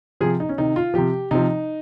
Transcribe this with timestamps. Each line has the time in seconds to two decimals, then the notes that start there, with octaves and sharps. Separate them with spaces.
0.21 C3 F3 G#4
0.40 D#4
0.49 C#4
0.58 C3 D#3 D#4
0.76 F4
0.94 C3 F3 G4
1.31 C3 F3 D#4